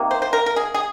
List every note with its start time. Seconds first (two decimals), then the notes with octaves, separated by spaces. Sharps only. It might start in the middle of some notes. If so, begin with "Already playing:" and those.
Already playing: C3 D#3 A#3
0.11 C5
0.22 C5
0.33 A#4
0.46 A#4
0.56 G#4
0.74 G#4